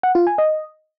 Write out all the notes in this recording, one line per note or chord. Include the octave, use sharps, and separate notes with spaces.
F#5
F4
G#5
D#5